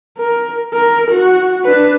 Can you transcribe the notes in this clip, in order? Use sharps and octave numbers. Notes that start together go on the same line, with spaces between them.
A#4
A#4
F#4
D4 B4